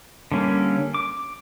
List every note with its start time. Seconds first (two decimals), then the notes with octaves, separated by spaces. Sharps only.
0.32 D3 G3 A#3 C#4
0.94 D6